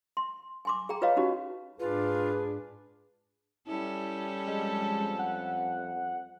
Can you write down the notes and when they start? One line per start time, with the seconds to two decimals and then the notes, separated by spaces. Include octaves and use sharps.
0.17 C6
0.65 G#5 C6 D6
0.89 G#4 G5 A#5
1.02 F4 B4 C#5 D#5 F5
1.17 C#4 D#4 F#4 G4
1.79 G#2 D4 F4 G#4 B4
3.67 G3 C#4 E4 A4
4.47 F2 G#3
5.19 F#5